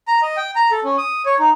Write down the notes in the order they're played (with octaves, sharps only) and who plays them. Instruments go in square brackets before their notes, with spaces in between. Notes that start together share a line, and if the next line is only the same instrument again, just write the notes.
[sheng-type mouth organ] A#5
D#5
G5
A#5
A4
C#4
D#6
C#5
D#4